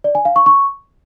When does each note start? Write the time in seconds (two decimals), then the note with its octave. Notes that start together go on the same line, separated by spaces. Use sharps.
0.04 D5
0.15 G#5
0.25 F5
0.36 C#6
0.46 C#6